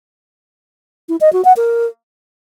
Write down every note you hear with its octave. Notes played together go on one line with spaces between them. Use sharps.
E4
D#5
F#4
F#5
A#4